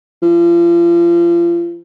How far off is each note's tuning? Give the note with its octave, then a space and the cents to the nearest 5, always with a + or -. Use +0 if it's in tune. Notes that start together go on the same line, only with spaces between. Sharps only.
F3 -35